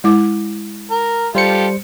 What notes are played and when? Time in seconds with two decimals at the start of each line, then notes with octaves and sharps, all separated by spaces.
0.04 G#3 E4 D6
0.91 A#4
1.35 G3 F4 G4 A4 C5 C#7